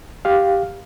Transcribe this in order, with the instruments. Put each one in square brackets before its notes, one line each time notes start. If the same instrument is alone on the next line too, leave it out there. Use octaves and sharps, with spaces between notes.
[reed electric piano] G4 F5